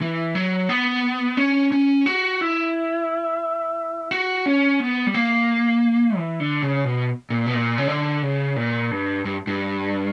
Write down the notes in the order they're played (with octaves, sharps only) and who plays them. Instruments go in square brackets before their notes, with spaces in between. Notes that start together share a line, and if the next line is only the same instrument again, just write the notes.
[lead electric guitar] E3
F#3
B3
C#4
C#4
F#4
E4
F#4
C#4
B3
G3
A#3
E3
D3
C#3
B2
A#2
B2
A#2
C#3
D3
C#3
A#2
G2
G2
G2